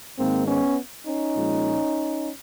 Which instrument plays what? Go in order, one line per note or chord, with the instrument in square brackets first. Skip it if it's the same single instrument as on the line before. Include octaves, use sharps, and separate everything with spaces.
[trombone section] G#2 D#3 G#3 A#3 C4
B3 C#4
C#4 D#4
A#2 F3 G#3